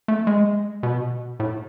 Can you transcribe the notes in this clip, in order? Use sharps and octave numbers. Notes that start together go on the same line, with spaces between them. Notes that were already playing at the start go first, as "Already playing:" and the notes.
A3
G#3
B2
A2